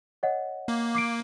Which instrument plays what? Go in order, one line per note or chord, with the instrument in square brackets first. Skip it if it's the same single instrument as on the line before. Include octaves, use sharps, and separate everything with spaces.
[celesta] C#5 D#5 F#5
[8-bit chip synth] A#3
[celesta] D6 C7 D7